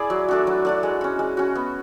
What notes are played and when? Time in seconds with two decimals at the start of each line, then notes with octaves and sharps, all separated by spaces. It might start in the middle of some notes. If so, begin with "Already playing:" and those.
Already playing: E4 G#4 D5
0.10 F#3
0.28 A3 D4 F#4
0.47 F#3
0.65 A3 D4 F#4
0.83 G#3
1.01 C#4 F#4
1.19 G#3
1.37 C#4 F#4
1.55 B3